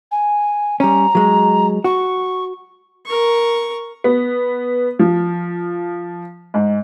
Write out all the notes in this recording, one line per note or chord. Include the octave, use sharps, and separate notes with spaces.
G#5
G3 C#4 A#5
F#3 G#3
F#4 C#6
A#4 C#6
B3
F3
G#2